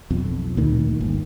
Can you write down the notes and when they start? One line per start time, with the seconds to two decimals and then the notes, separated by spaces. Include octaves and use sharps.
0.10 B1 F2
0.57 D2 A#2 D#3
1.01 G1